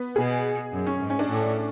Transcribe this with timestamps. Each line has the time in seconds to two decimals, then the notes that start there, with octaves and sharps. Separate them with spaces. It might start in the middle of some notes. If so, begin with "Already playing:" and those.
Already playing: B3
0.16 B2 G#4
0.72 F#2
0.86 C#4
1.01 G#2
1.10 C#4
1.19 D4
1.29 A2